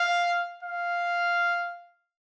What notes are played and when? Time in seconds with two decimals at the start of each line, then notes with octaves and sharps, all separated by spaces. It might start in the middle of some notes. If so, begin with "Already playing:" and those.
Already playing: F5
0.63 F5